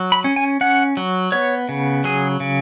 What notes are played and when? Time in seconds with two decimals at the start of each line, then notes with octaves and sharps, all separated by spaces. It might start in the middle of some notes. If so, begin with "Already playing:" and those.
Already playing: F#3
0.12 B5
0.24 C#4
0.36 G#5
0.61 C#4 F#5
0.97 F#3
1.32 B3 C#5
1.69 C#3
2.04 F#3 G#4
2.40 C#3